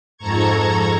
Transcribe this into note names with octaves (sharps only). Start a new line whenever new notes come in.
F2 G#2 A4 A#5 C#6 G#6